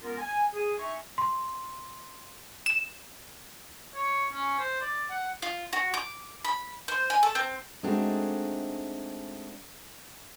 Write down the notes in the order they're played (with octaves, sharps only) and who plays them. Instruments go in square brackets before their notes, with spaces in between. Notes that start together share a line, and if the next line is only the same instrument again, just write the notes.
[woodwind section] G#3 B3 C#4 F4 A#4
G#5
G#4
D#4 E5 G#5 A#5 C6 C#6
[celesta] C6
[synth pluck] E7
[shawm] C#5
C#4
C5
D5
F#5
[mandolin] F4
F#4
D6
B5
C5
G#5
A4
C4
[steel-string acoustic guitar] G#3 A3 C4 D4 D#4 F#4